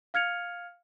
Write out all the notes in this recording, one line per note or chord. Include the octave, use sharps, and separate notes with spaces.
F5 F6 G#6 C#7 F7